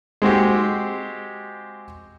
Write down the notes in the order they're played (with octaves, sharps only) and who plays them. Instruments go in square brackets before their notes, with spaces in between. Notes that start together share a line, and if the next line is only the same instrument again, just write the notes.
[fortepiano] G#3 C4 F#4 G4